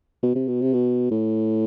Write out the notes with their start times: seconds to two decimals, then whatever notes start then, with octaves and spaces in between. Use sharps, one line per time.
0.23 B2
0.35 C3
0.48 B2
0.61 C3
0.73 B2
1.11 A2